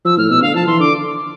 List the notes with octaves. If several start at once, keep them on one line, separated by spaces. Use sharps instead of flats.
F3 E6
A2 F6
B2 E6
D3 F5
F3 A5
E3 C6
D3 D6